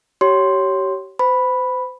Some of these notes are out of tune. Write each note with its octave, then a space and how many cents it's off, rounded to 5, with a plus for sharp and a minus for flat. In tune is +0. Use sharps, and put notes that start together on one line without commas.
G4 -30 C#5 +0 C6 +0
C5 -35 B5 +0